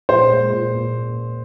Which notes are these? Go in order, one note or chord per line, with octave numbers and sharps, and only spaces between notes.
A#2 C5
G#3
A#2
A#2